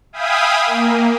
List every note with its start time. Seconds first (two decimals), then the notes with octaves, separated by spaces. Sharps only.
0.13 E5 F5 G5 G#5 B5 D#6
0.66 A#3